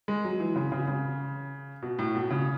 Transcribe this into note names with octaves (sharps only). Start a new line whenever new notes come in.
G#3
F#3
E3
C#3
C#3
C#3
B2
A2
B2
C#3